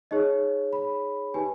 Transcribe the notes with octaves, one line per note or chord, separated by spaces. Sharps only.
D#4 G#4 C#5 D#5
B5
D#4 G4 B4 G#5